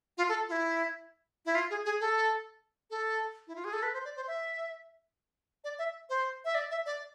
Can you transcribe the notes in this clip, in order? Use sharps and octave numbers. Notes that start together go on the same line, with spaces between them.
F4
A4
F4
E4
E4
F4
G#4
G#4
A4
A4
E4
F4
G#4
A4
B4
C5
D5
C5
E5
D5
E5
C5
E5
D5
E5
D5